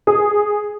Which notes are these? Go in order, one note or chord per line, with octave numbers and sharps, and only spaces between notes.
G#4